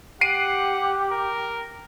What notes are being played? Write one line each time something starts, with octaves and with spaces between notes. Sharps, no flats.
G4 F#5 C7 D7 D#7
A#4